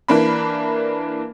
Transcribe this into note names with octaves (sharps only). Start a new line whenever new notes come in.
E3 A#3 D4 B5